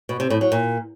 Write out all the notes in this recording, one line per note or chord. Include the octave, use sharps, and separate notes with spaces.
B2
C3
A2
F#3
A#2